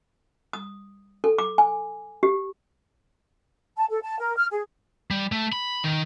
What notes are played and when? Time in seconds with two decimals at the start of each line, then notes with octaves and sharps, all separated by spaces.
0.53 D#6
1.24 A4
1.38 D6
1.58 G#5
2.23 G4
3.77 A5
3.90 A4
4.03 A5
4.19 A#4
4.37 F6
4.51 G#4
5.11 G3
5.32 A3
5.52 B5
5.84 D#3